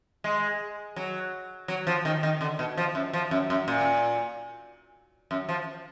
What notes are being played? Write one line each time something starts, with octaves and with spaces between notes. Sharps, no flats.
G#3
F#3
F#3
F3
D#3
D#3
D3
B2
F3
F#2
F3
F#2
F#2
A#2
F#2
F3